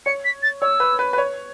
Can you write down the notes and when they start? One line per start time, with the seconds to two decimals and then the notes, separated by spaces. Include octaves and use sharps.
0.06 C#5 C#7
0.25 B6
0.43 A6
0.62 C#5 E6
0.80 B4
0.99 B4
1.13 B4
1.18 C#5